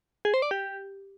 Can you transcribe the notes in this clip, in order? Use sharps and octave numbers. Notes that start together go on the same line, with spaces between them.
G#4
C5
D5
G4